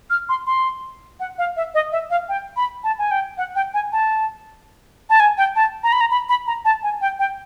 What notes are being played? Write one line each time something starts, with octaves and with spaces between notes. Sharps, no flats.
F6
C6
C6
F#5
F5
E5
D#5
E5
F5
G5
B5
A5
G#5
G5
F#5
G5
G#5
A5
A5
G#5
G5
A5
A#5
B5
A#5
B5
B5
A#5
A5
G#5
G5
G5